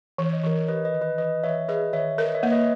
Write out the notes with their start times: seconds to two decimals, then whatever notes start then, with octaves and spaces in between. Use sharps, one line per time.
0.18 E3 C#5
0.33 D#5
0.43 E3 A#4 C#5
0.68 G4 B4 D#5
0.85 B4 D#5
0.94 D#3
1.02 B4 D#5
1.18 E3 B4 D#5
1.44 E3 C#5 E5
1.68 G#4 B4 D#5
1.93 D#3 C#5 E5
2.18 A#4 B4 D#5
2.35 C#5 E5
2.43 A#3
2.51 B4 D#5